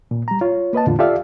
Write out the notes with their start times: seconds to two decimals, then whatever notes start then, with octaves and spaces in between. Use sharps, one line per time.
0.11 A#2
0.28 G3 A#5
0.41 F4 C#5
0.73 A#3 B4 D#5 A5
0.87 E2 A2 D3 F4
0.99 F4 G4 A4 D5 E5 F5